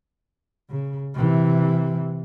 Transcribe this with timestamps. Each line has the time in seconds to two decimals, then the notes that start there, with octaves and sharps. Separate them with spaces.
0.70 C#3
1.14 C3 E3